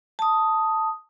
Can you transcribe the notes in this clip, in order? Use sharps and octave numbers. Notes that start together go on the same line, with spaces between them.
A5 D#6